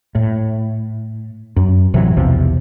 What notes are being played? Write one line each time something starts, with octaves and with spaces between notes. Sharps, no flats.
A2
F#2
A1 C3 E3 F#3
B1 E2 C3 F3